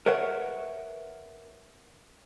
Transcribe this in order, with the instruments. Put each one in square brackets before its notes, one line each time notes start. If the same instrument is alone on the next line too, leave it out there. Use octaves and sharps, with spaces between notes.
[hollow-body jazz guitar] A#4 B4 C#5 E5 F#5